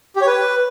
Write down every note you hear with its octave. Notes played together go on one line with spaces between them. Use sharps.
G4
C#5
B4